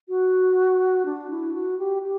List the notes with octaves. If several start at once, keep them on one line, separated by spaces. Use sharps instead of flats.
F#4
D4
E4
F#4
G4
G4